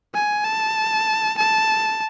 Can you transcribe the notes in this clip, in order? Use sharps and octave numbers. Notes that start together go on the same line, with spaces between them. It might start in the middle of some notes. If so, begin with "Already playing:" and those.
G#5
A5
A5